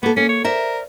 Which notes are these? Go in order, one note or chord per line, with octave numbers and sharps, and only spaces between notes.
A#3 B3 A4
A#3 C#4
C#5
A#4 C5 D5 E5